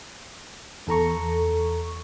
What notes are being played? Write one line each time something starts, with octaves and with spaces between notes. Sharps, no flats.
E2 A4 A#5 C#6